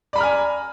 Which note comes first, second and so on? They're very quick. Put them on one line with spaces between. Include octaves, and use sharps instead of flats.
D5 B5 A#5 F6 G#5